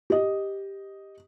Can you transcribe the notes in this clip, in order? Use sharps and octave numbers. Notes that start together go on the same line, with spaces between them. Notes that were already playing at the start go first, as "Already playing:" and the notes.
G4 D#5